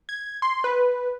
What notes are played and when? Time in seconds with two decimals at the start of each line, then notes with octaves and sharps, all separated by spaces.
0.09 G#6
0.42 C6
0.64 B4